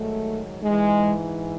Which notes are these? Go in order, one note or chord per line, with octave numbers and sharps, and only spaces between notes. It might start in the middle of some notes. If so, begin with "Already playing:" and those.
Already playing: G#2 D#3 F#3 A3
G#2 E3 G#3